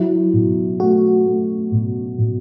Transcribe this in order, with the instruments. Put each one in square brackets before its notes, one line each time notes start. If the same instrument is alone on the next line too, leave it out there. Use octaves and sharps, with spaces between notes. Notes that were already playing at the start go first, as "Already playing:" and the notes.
Already playing: [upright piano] F#3 [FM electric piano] E4
[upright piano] B2
[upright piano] A3 [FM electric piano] F#4
[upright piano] A3
B2
B2